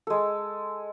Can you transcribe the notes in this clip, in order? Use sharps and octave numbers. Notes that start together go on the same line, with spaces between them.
G#3 A4